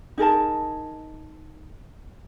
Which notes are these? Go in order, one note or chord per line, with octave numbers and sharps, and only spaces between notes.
D#4 G#4 A#4 A5